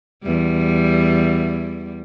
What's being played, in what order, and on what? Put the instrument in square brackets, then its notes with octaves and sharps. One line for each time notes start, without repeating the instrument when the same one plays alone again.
[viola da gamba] E2 G3